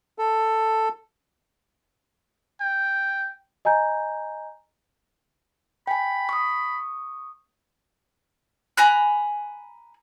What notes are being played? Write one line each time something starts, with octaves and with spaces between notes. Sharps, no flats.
A4
G5
D#5 G#5 A#5 G6
G5 G#5 B5
C#6 D#6
G#5 A#5 B5 F#6